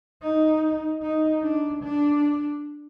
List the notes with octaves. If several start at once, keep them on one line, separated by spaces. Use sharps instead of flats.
D#4
D#4
D4
D4